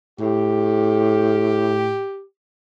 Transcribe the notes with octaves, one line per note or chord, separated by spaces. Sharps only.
A2 G4